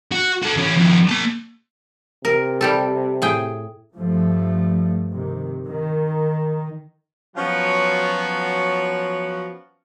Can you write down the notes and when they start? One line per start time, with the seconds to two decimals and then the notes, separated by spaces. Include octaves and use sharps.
0.12 F#4
0.43 F#4 A4
0.57 E3 C#4
0.75 D#2 F3
1.09 A#3 A5
2.25 C3 A#4
2.61 G3 G4 A4
3.22 A2 G#4 G5
3.95 G2 F3 A3
5.11 C3 D#3
5.66 D#3
7.36 F3 F#3 B3 C#4 F4 F#4